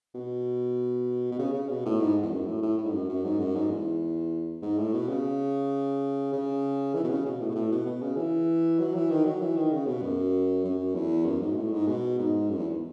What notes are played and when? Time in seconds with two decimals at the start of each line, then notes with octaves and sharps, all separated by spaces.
0.15 B2
1.31 B2
1.39 C#3
1.54 C#3
1.69 B2
1.86 A2
2.00 G#2
2.23 E2
2.31 F#2
2.46 A2
2.62 A2
2.78 A2
2.86 G#2
2.93 F#2
3.09 F#2
3.24 G#2
3.39 F#2
3.55 G#2
3.70 E2
4.62 G#2
4.78 A2
4.93 B2
5.09 C#3
6.33 C#3
6.94 E3
7.04 B2
7.10 C#3
7.26 B2
7.41 A2
7.49 B2
7.55 A2
7.72 B2
7.86 B2
8.02 C#3
8.17 E3
8.79 F#3
8.95 E3
9.11 D#3
9.25 F#3
9.42 E3
9.57 D#3
9.72 C#3
9.87 B2
10.02 F#2
10.65 F#2
10.95 E2
11.25 F#2
11.41 G#2
11.52 B2
11.57 A2
11.73 G#2
11.87 B2
12.19 G#2
12.50 F#2
12.58 E2